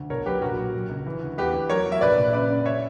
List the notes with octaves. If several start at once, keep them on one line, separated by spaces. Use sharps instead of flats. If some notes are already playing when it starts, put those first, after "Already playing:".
Already playing: D2
B1 A#4 C#5
F#3 G4 B4
A#1 F#4 A#4
F#3
F#3
C#2
E3
D2
E2 G4 B4
E2
F#3 A#4 C#5
F#3
E5
A#1 B4 D5
A#2
C#3 B4 D5
F#2
C#5 E5